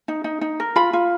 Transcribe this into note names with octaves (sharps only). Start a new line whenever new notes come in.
D#4
D#4
D#4
A#4
F4 B5
F4